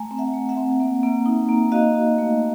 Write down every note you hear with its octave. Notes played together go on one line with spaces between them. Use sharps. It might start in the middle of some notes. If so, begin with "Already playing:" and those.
Already playing: A3 G#5 A#5
C4
E5 F#5
A3
E5 F#5
C4
A#3
A#3
D#4
A#3
F#4 D#5 F5
F#4
A3